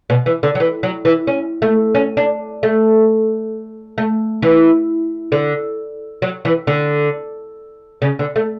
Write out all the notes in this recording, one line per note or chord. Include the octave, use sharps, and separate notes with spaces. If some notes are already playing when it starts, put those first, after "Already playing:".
B2
E3
D3
F#3
E3
F#3
E3
C#4
A3
C#4
D4
A3
A3
E3
D3
F#3
E3
D3
C#3
D3
A3